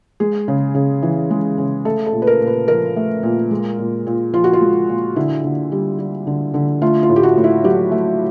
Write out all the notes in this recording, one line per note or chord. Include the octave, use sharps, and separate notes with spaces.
G#3 G#4
C#3
C#3
E3
G#3
C#3
A3 A4
A4
A#2
B4
A#4
A#2
B4
F3 A#4
A3
A#2
G#3
A#2
A#2
F3 F4
F#4
F4
G#3
A#2
D3 E4
D3
G3
G3
D3
D3
A3 F4
F4
A2
G4
F#4
A2
E4
F#3 G4
A3